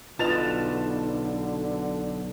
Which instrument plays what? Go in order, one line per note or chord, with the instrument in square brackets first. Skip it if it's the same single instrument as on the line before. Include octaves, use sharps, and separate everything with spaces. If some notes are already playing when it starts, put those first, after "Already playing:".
[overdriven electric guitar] B1 [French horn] D3 [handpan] F4 B4 D#5 [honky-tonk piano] A5 A6 F7